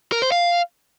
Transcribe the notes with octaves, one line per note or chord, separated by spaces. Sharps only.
A#4
C5
F5